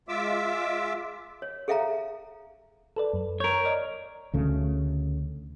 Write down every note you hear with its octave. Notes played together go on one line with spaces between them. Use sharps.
G#3 F4 E5 D6 E6
C#5
G#4 A4 E5 F5 G5 A#5
A4 B4 D5
F#2
A#4 C#5 G6 G#6
D5 D#5 F6
D2 C#3 A3